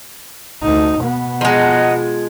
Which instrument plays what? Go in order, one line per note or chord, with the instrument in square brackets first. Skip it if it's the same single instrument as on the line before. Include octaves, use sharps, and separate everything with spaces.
[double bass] D2 D#4
B2 B3
[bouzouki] F3 G#3 [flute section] D#5 F#5 A#5